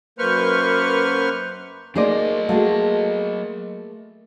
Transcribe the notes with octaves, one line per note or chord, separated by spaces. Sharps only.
F#2 A#3 B4 C5 C#6 F6
F#3 A3 A#3 D#4 G#4 C5 D5 D#5
A3 A#3 F#4 G#4 A4